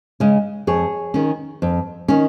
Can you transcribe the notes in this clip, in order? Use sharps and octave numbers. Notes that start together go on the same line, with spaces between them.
C#3 G#3 C#4
F2 G#4 C#5
D#3 C#4
F2
D#3 C#4